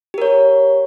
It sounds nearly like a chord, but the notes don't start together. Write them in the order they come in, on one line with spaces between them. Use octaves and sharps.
G4 A#4 C#5